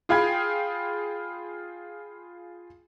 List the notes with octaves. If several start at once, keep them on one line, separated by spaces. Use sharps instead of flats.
F4 G#4 F5 G5 B5 G#6